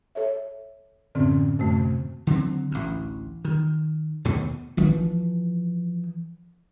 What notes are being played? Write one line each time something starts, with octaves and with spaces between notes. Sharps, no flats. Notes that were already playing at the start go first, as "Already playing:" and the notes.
A4 C#5 E5
F#2 A2 D3 E3 C4 C#4
F#2 C3 A3
D3 F#3 B3 C4
A1 D2
D#3
D#2 B2 A3
E3 F3